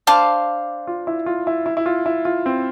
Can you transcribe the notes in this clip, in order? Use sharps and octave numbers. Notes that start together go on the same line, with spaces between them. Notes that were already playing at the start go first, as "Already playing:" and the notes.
D4 C5 F5 A5 D6
F4
E4
F4
E4
E4
E4
F4
E4
F4
C4